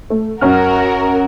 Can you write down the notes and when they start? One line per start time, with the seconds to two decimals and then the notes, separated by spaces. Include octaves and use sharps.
0.10 A3
0.41 F#2 C#4 F#4 A#4 F6